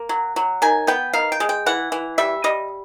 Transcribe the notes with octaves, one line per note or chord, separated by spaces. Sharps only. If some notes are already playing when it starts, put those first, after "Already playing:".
Already playing: A#3
F#3
F#3
D#3 G#5
B3 G5
D#3 F5
G5
G#3
G5
E3 F#5
E3
G3 E5
G3 D#5